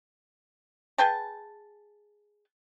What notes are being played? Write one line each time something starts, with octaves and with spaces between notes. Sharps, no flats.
G#4 B4 G5 A5